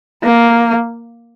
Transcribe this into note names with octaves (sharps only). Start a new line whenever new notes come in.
A#3